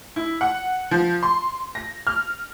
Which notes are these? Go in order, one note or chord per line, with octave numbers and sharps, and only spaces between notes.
E4
F#5
F3
C6
A#6
F6